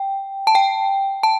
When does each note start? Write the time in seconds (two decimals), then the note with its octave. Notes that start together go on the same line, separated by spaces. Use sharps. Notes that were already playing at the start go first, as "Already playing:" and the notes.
Already playing: G5
0.47 A5
0.55 G5
1.23 A5